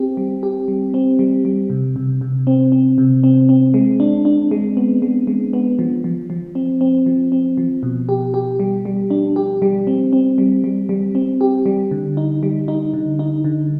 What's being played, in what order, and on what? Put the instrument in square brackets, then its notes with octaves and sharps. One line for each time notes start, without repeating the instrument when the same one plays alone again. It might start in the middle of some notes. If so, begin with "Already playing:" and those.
Already playing: [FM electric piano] C4 G4
G3
G4
G3
C4
G3
G3
C3
C3
C3
C4
C4
C3
C4
C4
G#3
D4
D4
G#3
B3
G#3
G#3
B3
F3
F3
F3
C4
C4
F3
C4
F3
B2
G4
G4
G3
G3
D4
G4
G3
C4
C4
G3
G3
G3
C4
G4
G3
D3
D#4
G3
D#4
D3
D#4
D3